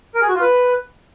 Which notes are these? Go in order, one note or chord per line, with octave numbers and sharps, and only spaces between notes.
A#4
G#4
F#4
F4
B4